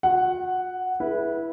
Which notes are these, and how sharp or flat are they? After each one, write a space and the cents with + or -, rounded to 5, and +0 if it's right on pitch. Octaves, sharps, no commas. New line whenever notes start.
F#4 -40 F#5 +0
E4 +0 G#4 +15 B4 -20